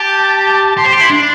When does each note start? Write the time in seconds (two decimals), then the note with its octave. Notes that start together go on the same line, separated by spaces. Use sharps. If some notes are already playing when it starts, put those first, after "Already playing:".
Already playing: G4 A5
0.77 G4 C6
0.85 C5
0.93 G4 C6
1.01 E4
1.10 D4